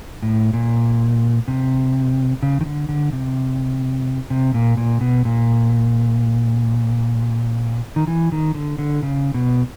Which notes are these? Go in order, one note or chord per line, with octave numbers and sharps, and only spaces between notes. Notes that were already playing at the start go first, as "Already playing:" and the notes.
A2
A#2
C3
C#3
D#3
D3
D3
C3
C3
A#2
A#2
B2
A#2
D#3
E3
D#3
D3
D3
C#3
B2